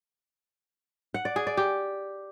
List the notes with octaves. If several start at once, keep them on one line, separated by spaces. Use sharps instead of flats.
F#5
D5
G#4
D5
G4